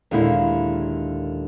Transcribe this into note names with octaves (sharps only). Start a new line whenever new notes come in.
D#2 A#2 D3 G#3 E4